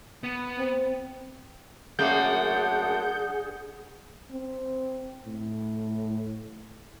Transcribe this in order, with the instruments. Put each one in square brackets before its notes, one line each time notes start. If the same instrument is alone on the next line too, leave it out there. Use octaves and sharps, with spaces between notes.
[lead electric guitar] B3
[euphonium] C4
[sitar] F#2 A3 A#3 [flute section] D4 F#5 [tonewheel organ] G#4 [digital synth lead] G6
[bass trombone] C4
A2